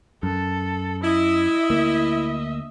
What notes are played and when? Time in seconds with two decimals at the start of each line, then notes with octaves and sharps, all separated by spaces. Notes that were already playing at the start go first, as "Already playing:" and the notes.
0.23 F#2 A4
1.03 E4 D#5 E5
1.70 D2 A#3